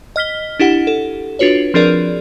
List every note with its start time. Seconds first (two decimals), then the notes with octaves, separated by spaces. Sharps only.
0.16 D#5 F6 B6 G7
0.60 D4 E4 G4 F#5
0.87 A4
1.39 D4 F4 F#4 B4 C#5
1.74 F3 C4 D4 G#4 A#4 D5